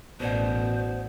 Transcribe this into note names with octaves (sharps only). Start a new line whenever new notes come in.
A1 B2 F#4 C5 D5 F#5